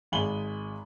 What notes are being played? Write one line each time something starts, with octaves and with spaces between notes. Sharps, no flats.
G#1 G#3 G#5 B5 F#7 G7